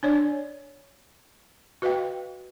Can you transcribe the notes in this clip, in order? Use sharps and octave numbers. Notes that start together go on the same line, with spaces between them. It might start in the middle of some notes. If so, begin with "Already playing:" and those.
D4 C#5 D5
F#4 B4 D#5 F5 G5